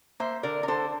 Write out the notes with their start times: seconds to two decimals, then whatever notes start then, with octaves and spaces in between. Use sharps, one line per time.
0.20 A#3 C5 E5
0.43 D3 A#4 D5
0.63 A#4
0.68 D3 A4 C5